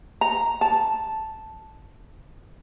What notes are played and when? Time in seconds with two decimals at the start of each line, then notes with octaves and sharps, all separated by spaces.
0.21 A#5
0.61 A5